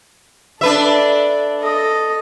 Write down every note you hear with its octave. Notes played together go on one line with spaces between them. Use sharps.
D4 A4 B4 E5
A4 D#5